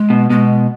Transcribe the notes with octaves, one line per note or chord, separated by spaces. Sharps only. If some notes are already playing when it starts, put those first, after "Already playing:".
Already playing: G#3
B2
B2 G#3